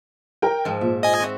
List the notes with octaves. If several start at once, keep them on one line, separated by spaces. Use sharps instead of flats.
A#4 G5
G#2 F3
A#2 E5
D#5 G#5
C4 F#4 E5